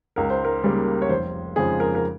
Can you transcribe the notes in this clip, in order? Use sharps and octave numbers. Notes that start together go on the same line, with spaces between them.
C#2 A#4
C5
A#4
C#3 G3 A#3
C#5
F1 C5
F2 C#3 F3 G#3 G#4
A#4
A#4